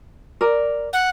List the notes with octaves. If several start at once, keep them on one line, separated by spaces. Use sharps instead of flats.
A#4 D5
F#5